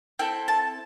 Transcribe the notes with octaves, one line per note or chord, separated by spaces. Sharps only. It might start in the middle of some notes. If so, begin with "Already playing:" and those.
C4 E4 A4 G5
A5